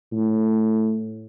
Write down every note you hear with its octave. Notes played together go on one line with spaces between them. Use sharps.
A2